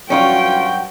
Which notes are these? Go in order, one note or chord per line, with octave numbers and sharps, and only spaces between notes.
G2 F#3 C#4 D#4 F4 F#4 G5